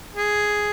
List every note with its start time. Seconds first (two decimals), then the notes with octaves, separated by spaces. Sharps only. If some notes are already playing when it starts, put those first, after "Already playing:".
0.15 G#4